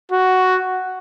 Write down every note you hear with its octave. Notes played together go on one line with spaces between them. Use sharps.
F#4